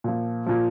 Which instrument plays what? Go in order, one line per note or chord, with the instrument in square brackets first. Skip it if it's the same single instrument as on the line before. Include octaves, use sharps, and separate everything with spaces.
[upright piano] A#2 F3
A#2 F3